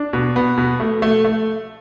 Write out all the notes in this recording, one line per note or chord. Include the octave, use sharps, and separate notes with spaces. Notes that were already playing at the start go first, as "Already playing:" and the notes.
Already playing: D4
B2
B3
B2
A3
A3
A3